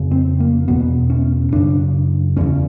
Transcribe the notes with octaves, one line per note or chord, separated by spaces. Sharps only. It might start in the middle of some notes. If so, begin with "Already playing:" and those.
Already playing: F2 C#3
C4
A#3
E2 B2 B3
C#4
F#2 C#3 D4
E2 C#3 C#4